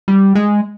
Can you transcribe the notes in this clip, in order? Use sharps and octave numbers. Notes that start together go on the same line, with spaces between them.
G3
G#3